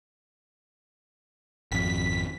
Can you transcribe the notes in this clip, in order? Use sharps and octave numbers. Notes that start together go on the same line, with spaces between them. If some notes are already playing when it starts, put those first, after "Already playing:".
G#1 F2 B6